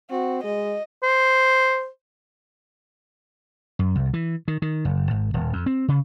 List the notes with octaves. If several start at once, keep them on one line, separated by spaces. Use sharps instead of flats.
C4 F#4
G#3 D#5
C5
F#2
C2
E3
D#3
D#3
F#1
G#1
D#1
F2
C4
C#3